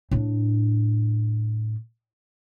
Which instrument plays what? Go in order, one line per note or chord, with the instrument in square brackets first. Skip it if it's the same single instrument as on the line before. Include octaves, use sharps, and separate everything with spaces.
[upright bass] A2 D4